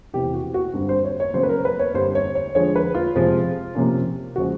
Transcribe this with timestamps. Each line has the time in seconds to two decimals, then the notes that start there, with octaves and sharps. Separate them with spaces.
0.14 E2 C3 E3 G4
0.34 F#4
0.54 F#4
0.73 G2 D3 G3 C4
0.89 C5
1.05 C#5
1.20 C#5
1.34 C#3 F#3 B3 C5
1.43 B4
1.49 A#4
1.65 B4
1.79 C#5
1.94 G2 D3 G3 C4 C5
2.15 C#5
2.35 C#5
2.55 D3 F3 G#3 C#5
2.76 B4
2.95 F4
3.15 F2 C3 F3 G#3
3.75 C3 F3 A#3 C#4
4.36 C#3 F3 G#3 F#4